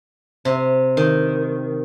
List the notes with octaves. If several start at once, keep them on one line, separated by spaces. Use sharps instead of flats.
C3
D#3